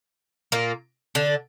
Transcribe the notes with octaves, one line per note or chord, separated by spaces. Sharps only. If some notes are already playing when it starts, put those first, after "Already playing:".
A#2 A#3
D3 D4